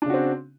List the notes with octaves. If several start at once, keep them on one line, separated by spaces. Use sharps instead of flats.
C#3 C4 D4 F#4